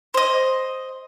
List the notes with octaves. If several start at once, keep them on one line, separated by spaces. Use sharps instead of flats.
C5 D#5